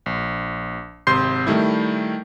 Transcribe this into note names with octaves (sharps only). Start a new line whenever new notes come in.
A#1
G#1 C3 C6 G6 C7
D#3 G3 A3 E4